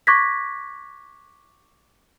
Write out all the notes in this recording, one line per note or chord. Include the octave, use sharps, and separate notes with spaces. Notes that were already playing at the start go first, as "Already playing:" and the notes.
C#6 D6 F#6 G#6 A#6 B6